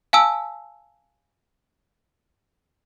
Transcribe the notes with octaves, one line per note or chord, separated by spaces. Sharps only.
F5 G#5 A5 E6